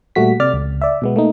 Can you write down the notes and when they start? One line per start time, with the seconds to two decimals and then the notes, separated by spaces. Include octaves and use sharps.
0.16 A#2 G3 A3 F#4 B6
0.40 C3 D5 F6 A6
0.54 C#2
0.82 D5 E5
1.02 B2 G#3 B3
1.16 A3 A#3 D#4